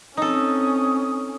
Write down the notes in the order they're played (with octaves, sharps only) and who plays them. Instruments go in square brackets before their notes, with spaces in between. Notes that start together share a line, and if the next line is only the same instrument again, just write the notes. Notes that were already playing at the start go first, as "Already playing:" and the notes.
[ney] C4 [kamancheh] C#4 [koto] D#4 A4 [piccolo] D#6